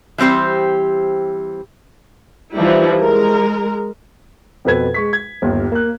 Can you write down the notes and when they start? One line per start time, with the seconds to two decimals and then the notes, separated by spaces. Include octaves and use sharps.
0.18 E3 G3 C4 G4 C5
2.53 E3 F3 G3 D#4 E4
3.00 G#3 A#4
4.65 F2 B2 A4 B4 G#6
4.94 G#3 C#6 B6
5.13 G#6
5.42 G1 D#2
5.72 A#3 F#6